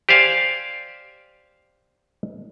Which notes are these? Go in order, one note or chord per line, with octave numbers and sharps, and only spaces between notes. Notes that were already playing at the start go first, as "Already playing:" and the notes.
G4 C5 D5 F5 G#5